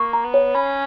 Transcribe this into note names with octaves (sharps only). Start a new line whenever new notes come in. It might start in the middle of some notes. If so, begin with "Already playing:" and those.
Already playing: A#3 C#6
A#5
B3
C#5
C#4 B5